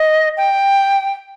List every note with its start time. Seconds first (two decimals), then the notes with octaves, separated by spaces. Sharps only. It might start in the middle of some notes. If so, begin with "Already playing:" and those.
Already playing: D#5
0.37 G5